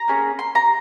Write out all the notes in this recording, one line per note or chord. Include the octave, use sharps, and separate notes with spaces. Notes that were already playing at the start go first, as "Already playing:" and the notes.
Already playing: A#5
A#3 C#4 G#4
C6
A#5